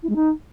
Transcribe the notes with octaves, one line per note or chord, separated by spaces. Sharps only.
E4
G#3
D#4